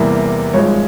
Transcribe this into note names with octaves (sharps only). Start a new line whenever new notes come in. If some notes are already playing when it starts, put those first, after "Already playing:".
Already playing: E2 C3 E3 G3 A#3
G#1 G2 F3 G#3 C#5